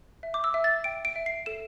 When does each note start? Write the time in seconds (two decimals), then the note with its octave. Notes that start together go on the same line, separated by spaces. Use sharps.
0.23 E5
0.34 D6
0.44 E6
0.54 E5
0.64 A6
0.84 G5 D7
1.05 D7
1.16 E5
1.26 C7
1.46 A4 E7